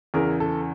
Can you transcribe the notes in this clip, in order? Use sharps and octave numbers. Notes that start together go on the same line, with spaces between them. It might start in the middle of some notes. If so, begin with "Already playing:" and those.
E2 C#3 E3 G#4 A#4
A4